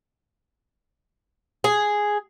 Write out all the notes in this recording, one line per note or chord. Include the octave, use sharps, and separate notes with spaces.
G#4